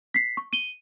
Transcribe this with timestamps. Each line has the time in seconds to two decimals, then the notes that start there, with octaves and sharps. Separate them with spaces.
0.14 B6 C7
0.37 C#6
0.53 D#7 G7